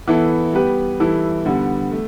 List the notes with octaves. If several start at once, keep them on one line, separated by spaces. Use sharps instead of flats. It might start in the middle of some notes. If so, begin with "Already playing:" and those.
E3 B3 E4 A4
G3 B3 G4 B4
E3 G3 E4 A4
D3 G3 B3
A3